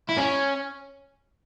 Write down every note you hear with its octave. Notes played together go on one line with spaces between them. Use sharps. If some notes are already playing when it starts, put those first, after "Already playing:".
E4
C#4